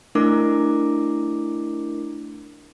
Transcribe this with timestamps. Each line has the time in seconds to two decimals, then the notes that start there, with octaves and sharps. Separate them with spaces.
0.15 A3 D4 E4 A#4 D6